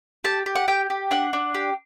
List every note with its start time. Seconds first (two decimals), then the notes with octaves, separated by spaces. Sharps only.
0.24 G4 A5
0.46 G4
0.56 F#5
0.68 G4 G5
0.90 G4
1.11 D4 F#5
1.33 D4
1.55 G4